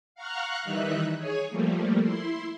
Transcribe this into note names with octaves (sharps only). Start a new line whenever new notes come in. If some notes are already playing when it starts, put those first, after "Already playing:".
F5 F#5 A#5 C#6 F6 F#6
D#3 E3 G3 D#4 E5 F#6
G#4 C#5 G#5
F3 G3 A3 A#3
E4 C6